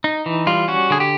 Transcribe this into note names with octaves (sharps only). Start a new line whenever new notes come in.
D#4
E3
G3 F4
C#4 F#4
D3 G#4
G4